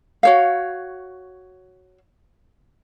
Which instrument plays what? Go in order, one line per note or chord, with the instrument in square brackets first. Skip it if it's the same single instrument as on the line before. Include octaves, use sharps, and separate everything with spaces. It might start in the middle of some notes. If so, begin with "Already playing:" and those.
[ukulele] F#4 C#5 F5